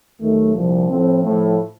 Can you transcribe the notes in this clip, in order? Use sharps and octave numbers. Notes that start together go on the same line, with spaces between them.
D#2 D#3 F#3 A3
C2 A#2 F3
A2 F3 C4
A2 F3 A3